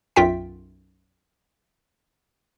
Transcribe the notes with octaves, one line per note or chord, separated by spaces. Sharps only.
B1 F#2 F4 E5 G5 B6